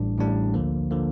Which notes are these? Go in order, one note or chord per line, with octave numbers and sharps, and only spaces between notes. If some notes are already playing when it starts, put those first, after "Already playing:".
Already playing: A1 A2 G3 D4
A1 A2 G3 D4
D2 D3 F3 A#3
D3 F3 A#3